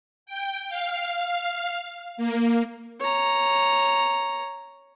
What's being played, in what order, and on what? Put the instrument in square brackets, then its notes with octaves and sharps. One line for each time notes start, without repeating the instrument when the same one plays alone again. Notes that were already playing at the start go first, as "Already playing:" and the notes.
[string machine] G5
F5
A#3
[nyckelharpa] C#5 A#5